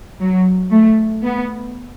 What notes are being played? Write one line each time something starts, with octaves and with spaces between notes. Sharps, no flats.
F#3
A3
B3